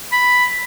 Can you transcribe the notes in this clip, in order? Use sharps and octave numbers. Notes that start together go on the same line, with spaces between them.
B5